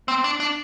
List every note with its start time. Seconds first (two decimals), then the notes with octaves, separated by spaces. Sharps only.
0.08 C4
0.24 D4
0.40 D4